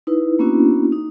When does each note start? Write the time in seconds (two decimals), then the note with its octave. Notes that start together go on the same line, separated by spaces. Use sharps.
0.07 D#4 E4 B4
0.39 A#3 B3 C#4 D4 E4 F#4
0.92 D#4